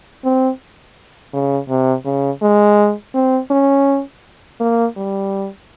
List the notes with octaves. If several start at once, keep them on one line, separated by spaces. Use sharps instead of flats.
C4
C#3
C3
C#3
G#3
C4
C#4
A#3
G3